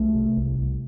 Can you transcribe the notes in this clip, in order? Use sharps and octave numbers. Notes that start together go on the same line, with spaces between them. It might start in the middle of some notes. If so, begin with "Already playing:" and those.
Already playing: C2 A3
C3
C2
C2